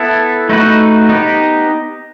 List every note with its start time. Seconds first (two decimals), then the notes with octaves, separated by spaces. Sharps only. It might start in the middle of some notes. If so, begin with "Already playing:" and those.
Already playing: B3 E4 A4
0.49 A3 D#4 F#4 B4
1.09 B3 D#4 G4